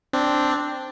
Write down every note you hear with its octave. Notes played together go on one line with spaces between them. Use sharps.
C4 D4